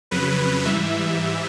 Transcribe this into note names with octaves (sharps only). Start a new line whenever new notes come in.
F2 C#3 F#3 B4
G#2 E3 G3 E5